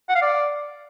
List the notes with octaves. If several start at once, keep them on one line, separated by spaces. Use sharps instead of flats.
F#5
F5
D5